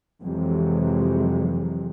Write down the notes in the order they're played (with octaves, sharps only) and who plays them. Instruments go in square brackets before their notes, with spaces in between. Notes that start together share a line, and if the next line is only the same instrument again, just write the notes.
[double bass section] F2 C3 E3 F#3 G#3